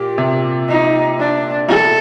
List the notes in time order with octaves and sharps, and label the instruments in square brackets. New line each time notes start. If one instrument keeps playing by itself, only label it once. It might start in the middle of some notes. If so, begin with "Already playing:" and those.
Already playing: [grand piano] A#2 [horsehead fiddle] G4
[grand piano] C3
[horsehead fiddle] D#4
D4
A4